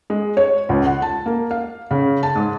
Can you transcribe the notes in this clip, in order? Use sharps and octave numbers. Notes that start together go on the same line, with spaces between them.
G#3
C#5
C#2
F#5
A5
A#3
F5
C#3
A5
G#2